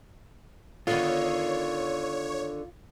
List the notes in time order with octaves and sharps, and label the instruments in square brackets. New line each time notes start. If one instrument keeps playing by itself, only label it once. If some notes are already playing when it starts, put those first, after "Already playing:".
[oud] D3 D#3 B3 [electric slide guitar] F4 [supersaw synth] C#5